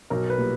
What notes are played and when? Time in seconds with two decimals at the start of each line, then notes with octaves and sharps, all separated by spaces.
0.10 B1 A#4
0.30 B4
0.38 A#2 G3